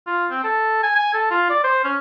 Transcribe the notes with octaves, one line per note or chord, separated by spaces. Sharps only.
F4
C4
A4
G#5
G#5
A4
F4
D5
C5
C#4